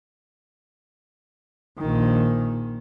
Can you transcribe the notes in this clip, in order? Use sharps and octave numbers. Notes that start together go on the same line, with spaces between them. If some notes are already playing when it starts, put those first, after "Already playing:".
A#1 D#3